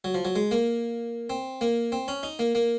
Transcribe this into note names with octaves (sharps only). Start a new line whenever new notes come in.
F#3
F3
F#3
G#3
A#3
C4
A#3
C4
C#4
D#4
A#3
A#3